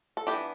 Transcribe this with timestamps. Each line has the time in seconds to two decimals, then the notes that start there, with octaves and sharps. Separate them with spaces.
0.17 A4
0.27 E3 B3 D4 G4